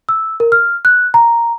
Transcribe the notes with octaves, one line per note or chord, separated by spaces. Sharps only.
E6
A#4
F6
F#6
A#5